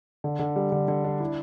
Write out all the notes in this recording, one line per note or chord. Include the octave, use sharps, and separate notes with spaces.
D3
D3
G3
D3
D3
D4
E4